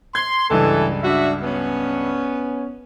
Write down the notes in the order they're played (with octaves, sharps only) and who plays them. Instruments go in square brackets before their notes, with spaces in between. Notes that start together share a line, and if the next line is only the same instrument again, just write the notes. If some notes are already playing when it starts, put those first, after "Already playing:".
[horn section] C6 [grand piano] G#6
[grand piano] C#2 G2 [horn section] E3 A4
[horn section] D4 F#4 E5
B3 C#4